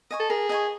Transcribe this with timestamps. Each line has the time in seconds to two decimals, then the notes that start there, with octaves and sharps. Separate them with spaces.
0.11 D#5 G#5 C#6
0.20 A4
0.30 G#4 A#4
0.49 D#5 G#5 C#6